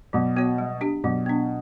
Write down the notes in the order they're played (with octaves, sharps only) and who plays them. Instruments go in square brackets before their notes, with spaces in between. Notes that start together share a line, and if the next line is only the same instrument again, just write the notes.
[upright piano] B2 [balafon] F#3
[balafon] B3 F#4 C#5
G3
D4 G4
[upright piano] B2 [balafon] F#3
[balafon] B3 D4